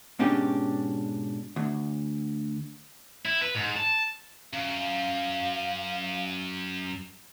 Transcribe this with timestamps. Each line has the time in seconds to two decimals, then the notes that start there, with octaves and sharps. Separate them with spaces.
0.19 G#2 B2 C#4 D4 G4
1.56 D2
3.25 E4
3.42 B4
3.55 G#2
3.76 A5
4.53 F#2 F5